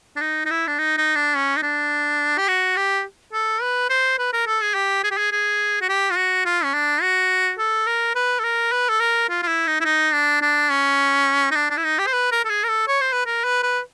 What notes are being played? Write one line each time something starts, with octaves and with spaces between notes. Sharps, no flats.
D4
D#4
D#4
E4
D4
D#4
D#4
D4
C#4
D#4
D4
G4
F#4
G4
A4
B4
C5
B4
A#4
A4
G#4
G4
G#4
G4
G#4
G#4
F#4
G4
F4
F#4
F4
C#4
D4
F#4
A4
A#4
B4
A4
A#4
B4
A4
A#4
F4
F4
E4
D#4
E4
D#4
D4
D4
C#4
D#4
D4
D4
E4
D#4
G4
C5
B4
A#4
A4
G#4
A#4
A4
C#5
C5
B4
A#4
B4
B4